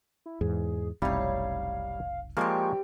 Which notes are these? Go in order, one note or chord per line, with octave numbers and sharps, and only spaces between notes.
E4
E2 G#2 G#4
F1 B1 G3 C4 D#4 E4 C#5 F5
F3 G3 G#3 A#3 C4 G4 C#6